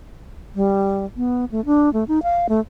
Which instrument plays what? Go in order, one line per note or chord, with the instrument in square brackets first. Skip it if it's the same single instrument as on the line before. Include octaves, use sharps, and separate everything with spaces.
[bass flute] G3
B3
A3
D4
A3
D#4
F5
A3